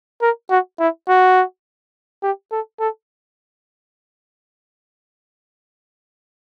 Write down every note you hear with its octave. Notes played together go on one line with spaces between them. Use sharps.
A#4
F#4
E4
F#4
G4
A4
A4